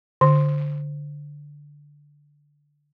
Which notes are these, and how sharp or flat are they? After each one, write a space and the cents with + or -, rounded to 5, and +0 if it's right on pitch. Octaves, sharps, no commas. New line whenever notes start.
D3 -5